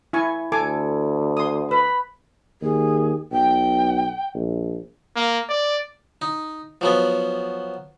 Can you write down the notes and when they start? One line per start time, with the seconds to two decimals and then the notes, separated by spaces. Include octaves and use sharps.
0.13 E4 G#5 C#6
0.52 D2 A4 G#5 D6
1.37 C6 D#6
1.71 B4 B5
2.61 D#2 G#4
3.32 B1 G5
4.34 A#1
5.16 A#3
5.49 D5
6.22 D#4
6.81 F3 F#3 B3